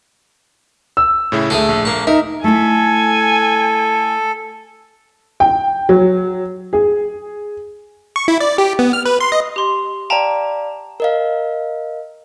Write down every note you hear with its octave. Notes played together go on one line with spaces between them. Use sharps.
E6
A2 C#3 E4
D2 A3 G#4 A4
A#1
A#3 A5
D#4 A#4 E5
A3 E4 A4 G#5
G5
F#3
G#4
C#6
E4
D5
G4
B3
F6
B4
C6
D#5
G4 C6
D5 F5 G5 A5 A#5
A#4 D#5 F5